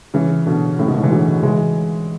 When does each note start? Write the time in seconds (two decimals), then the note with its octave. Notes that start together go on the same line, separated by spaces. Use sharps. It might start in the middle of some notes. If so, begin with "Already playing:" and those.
0.14 C#3 E3
0.46 B2 D3
0.79 A2 C#3
0.87 G#2 B2
0.94 A2
1.03 E3 G#3
1.11 D3 F#3
1.43 E3 G#3